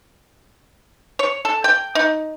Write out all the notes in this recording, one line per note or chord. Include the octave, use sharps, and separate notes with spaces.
C#5
A4
G5
D#4